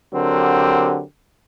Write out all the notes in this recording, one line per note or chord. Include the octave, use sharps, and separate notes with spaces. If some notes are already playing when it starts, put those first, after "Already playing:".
D3 F#3 C4 G4 A#4